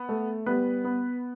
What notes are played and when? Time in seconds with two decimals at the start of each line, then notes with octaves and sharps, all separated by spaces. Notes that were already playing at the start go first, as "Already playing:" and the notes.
Already playing: B3
0.09 A3
0.46 G3 B3 B4
0.84 B3